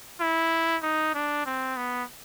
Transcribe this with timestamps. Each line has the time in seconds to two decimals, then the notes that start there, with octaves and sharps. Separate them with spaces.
0.20 E4
0.83 D#4
1.14 D4
1.46 C4
1.77 B3